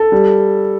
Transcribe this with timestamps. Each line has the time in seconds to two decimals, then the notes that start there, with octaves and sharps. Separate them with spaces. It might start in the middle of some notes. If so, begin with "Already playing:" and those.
Already playing: A4
0.12 G3